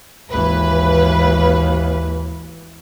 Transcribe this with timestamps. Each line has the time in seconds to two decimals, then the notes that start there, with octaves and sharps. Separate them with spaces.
0.30 G#1 D#2 E3 B4